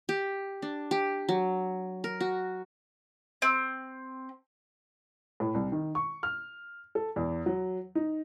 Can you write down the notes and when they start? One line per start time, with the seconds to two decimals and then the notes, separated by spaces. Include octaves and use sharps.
0.09 G4
0.62 D4
0.91 G4
1.29 F#3
2.04 A#4
2.20 F#4
3.42 C4
5.40 A2
5.54 C2
5.72 D#3
5.95 C#6
6.23 F6
6.95 A4
7.16 E2
7.46 F#3
7.95 D#4